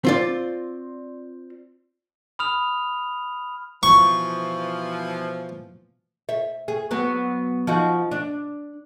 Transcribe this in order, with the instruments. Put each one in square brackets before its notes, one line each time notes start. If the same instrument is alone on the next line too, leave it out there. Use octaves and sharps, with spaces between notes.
[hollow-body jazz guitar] C4 F4 D5
[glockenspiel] B5 D#6 F6 F7
[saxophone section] B2 E3 F3 [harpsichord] C#6
[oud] E5
G#4
F#3 B3
F3 D#4 F#4
D4